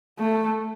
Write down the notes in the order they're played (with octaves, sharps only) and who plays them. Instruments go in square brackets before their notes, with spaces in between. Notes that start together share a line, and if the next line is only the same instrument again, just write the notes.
[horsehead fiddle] A3